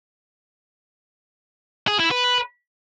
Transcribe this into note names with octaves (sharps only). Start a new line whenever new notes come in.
G#4
E4
B4